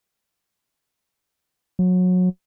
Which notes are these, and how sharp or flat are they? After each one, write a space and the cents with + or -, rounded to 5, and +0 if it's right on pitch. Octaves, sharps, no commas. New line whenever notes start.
F#3 -25